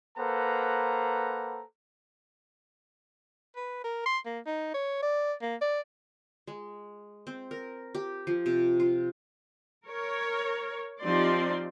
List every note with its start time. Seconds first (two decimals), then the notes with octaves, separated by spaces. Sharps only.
0.17 A#3 A4 B4 C5 F#5 A#5
3.56 B4
3.84 A#4
4.06 C6
4.26 A#3
4.46 D#4
4.74 C#5
5.02 D5
5.42 A#3
5.61 D5
6.47 G#3
7.27 C4
7.51 A#4
7.95 G4
8.27 F3
8.46 C3
8.80 F4
9.86 A#4 C#5
11.01 F3 C4 D#4 G4 D5 C6